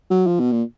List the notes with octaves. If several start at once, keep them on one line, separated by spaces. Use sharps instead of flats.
F#3
F3
B2
A#2